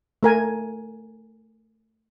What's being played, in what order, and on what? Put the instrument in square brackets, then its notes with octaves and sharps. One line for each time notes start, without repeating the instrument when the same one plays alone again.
[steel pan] A3 A#4 G#5